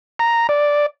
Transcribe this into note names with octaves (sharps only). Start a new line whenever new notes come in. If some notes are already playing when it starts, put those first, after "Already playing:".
A#5
D5